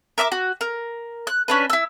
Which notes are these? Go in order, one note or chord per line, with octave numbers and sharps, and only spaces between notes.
A#4 E5 C#6 D6
F#4
A#4
F#6
C#4 D4 B4
E4 E6